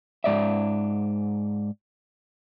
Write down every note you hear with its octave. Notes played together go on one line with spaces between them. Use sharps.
G#2 D5 E5